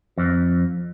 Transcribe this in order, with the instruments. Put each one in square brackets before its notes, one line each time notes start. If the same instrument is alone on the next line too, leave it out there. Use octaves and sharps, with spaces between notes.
[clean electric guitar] F2